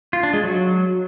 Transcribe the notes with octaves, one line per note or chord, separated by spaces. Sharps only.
F4
D4
G#3
F#3